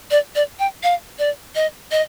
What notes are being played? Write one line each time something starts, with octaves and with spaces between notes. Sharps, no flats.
D5
D5
G5
F5
D5
D#5
D#5